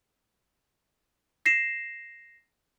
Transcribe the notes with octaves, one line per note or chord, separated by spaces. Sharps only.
A#6 C7 E7